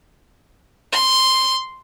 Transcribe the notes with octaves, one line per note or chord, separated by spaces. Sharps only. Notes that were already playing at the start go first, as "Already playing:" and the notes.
C6